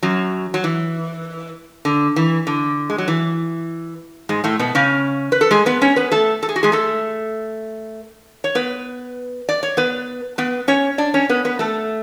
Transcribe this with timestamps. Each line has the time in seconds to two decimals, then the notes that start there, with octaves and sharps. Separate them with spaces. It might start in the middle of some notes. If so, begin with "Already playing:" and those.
0.03 F#2 F#3
0.54 F#3
0.64 E3
1.85 D3
2.16 E3
2.47 D3
2.90 G#3
2.98 F#3
3.08 E3
4.29 G#2 G#3
4.44 A2 A3
4.59 B2 B3
4.75 C#3 C#4
5.32 B4
5.41 A4
5.51 G#3 G#4
5.66 B3 B4
5.82 C#4 C#5
5.96 B3 B4
6.12 A3 A4
6.43 A4
6.49 G#4
6.56 F#4
6.63 G#3 G#4
6.72 A3 A4
8.44 C#5
8.55 B3 B4
9.49 D5
9.63 C#5
9.77 B3 B4
10.38 B3 B4
10.68 C#4 C#5
10.98 D4 D5
11.14 C#4 C#5
11.29 B3 B4
11.45 B3 B4
11.59 A3 A4